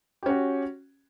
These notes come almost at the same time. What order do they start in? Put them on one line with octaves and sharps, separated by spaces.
G4 C#4 F#4